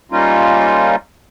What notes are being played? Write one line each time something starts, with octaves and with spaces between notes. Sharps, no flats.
G3 A#3 C#4 D#4 F4